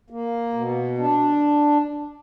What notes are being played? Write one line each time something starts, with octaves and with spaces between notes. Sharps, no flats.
A#3
B2
D4